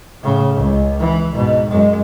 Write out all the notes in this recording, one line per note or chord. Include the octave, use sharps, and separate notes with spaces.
A2 C#3
C#2
E3
G#2 B2
F#2 G#3